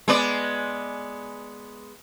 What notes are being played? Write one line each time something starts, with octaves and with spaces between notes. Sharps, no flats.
G#3 B3 D5